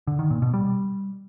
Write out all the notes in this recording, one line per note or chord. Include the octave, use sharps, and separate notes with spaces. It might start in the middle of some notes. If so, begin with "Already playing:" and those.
D3
D#3
A#2
B2
G3